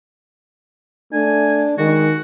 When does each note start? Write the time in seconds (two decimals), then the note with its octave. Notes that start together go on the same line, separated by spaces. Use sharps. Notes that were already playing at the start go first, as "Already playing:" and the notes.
1.13 A3 D4 G#5
1.78 D#3 G#3 F#4